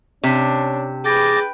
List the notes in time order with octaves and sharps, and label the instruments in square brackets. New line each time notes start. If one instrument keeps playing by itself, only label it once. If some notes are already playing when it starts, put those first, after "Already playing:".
[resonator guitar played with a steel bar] C3 [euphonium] C#4 [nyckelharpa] D4
[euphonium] G#4 [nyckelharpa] B4 G5 [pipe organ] D6 A6 A#6